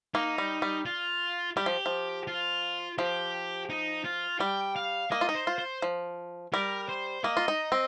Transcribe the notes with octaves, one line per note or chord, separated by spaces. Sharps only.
A#3 D#4
G3
G3
F4
G3 G4
F3
F3
F4
F3 G4
D#4
F4
G3 G5
F5
A#3 D#5
F4
D#4
C5
F4
C5
F3
G3 A#4
C5
A#3 D#5
F4
D#4
C4